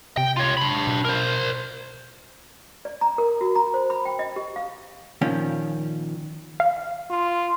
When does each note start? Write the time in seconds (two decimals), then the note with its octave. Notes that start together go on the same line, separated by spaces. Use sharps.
0.17 C3 G5
0.37 F4 C#5
0.57 D4 B5
0.87 B2
1.05 A#4 C5
2.85 D5
3.01 A#5
3.18 A#4
3.41 F#4
3.55 A#5
3.74 C5
3.90 B5
4.05 G5
4.19 D#5
4.36 G4
4.56 F5
5.21 A#2 D#3 F3 C#4
6.60 F5
7.11 F4